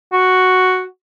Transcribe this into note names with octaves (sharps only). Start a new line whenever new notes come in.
F#4